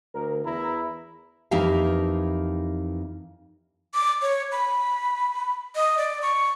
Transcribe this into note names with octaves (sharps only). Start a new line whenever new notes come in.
D2 A#4
E2 E4 A#5
F2 E3 A#3 D#4 G4 F5
D6
C#5
B5
D#5
D5
C#6